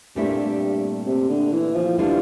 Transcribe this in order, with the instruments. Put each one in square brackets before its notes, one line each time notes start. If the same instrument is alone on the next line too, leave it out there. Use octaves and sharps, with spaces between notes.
[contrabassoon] G2 [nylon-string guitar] A#2 A3 C4 E4 G4
[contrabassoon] C3
D3
E3
F3
[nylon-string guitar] D3 G3 D4 F4 [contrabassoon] E3